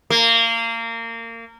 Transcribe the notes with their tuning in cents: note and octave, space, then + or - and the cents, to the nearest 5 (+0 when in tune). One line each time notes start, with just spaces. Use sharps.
A#3 -25